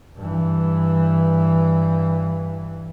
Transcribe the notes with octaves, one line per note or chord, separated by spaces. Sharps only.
G2 E3